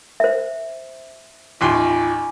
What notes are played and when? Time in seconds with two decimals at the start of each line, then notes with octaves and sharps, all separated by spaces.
0.20 C5 E5
1.61 A1 D#2 F4 G#5 B5 C6 D6